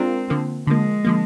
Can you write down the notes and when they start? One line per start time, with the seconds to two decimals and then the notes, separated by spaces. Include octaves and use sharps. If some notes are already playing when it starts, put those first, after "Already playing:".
Already playing: G#3 C4 D4 F4 A#4
0.30 D3 F3 A#3
0.67 D3 F3 G#3 A#3
1.05 D3 F3 A#3